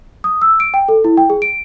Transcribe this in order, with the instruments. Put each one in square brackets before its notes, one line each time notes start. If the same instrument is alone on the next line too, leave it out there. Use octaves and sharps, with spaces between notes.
[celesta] D#6
E6
D7
G5
A4
E4
G5
G#4
D7